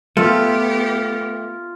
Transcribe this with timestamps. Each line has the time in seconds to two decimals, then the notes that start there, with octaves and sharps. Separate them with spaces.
0.17 A3 B3 F4 G4 F5